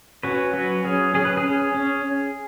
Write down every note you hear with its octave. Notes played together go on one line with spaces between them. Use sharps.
C#4 F#4 B4
F#3 F#4 B4
C#4 G#4
C#4 G#4
B4
G#4
C#4
C#4